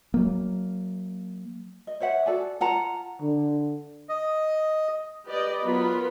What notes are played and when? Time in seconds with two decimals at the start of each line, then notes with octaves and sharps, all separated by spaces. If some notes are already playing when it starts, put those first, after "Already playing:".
0.14 F#3 A#3
1.87 D#5
2.00 C5 C#5 E5 F#5
2.26 F#4 A4 D5 G#5
2.61 F4 F#5 A5 A#5
3.22 D3
4.09 D#5
5.26 G4 B4 D5 D#5
5.64 F#3 B3 F4 A#4 B5